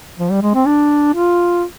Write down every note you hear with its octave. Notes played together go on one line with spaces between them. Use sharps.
F3
G3
G#3
C4
D4
F4